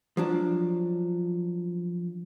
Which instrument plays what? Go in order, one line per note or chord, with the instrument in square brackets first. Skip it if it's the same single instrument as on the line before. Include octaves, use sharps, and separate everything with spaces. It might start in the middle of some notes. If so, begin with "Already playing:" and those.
[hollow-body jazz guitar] F3 F#3 D4